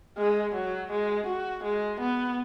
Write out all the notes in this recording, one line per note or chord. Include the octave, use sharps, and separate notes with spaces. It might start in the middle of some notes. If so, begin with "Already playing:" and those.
G#3
F#3
G#3
F#4
G#3
B3